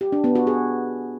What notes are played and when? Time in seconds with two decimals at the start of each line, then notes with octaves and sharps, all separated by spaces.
0.01 G4
0.12 D4
0.24 B3
0.35 F#4
0.47 G#4